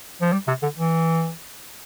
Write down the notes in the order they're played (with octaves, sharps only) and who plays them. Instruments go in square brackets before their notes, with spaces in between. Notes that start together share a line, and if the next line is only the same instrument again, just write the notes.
[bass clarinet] F3
G3
C3
D3
E3